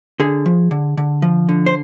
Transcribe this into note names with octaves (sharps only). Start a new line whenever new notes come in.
D3 G#4
F3
D3
D3
F3
D3
C5